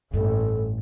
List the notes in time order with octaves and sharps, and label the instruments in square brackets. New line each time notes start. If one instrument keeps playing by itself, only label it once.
[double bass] A1 [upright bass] G2 A3 [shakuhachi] A4